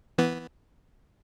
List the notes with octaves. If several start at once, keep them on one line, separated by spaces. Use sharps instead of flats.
E3 B3